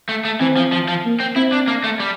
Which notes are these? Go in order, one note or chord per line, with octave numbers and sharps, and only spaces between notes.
A3
A3
E3 C4
F3
F3
F3
A#3
C4
C4 E4
D4
A#3
A3
G3